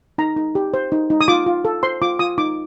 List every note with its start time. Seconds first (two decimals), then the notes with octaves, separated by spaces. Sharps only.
0.18 D#4 A#5
0.36 D#4
0.55 G4
0.74 C5
0.92 D#4
1.10 D#4
1.21 D#6
1.28 F4 D6
1.46 F4
1.65 A4
1.83 C5 C6
2.02 F4 D6
2.19 F4 D#6
2.38 D#4 D6